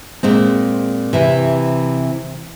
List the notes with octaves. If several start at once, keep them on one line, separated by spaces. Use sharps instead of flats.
A#2 G#3 C4
C3 E3